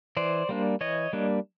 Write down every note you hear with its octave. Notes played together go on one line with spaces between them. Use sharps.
E3 C5 D5
G3 A#3 D4
E3 C#5 D#5
G3 A#3 D4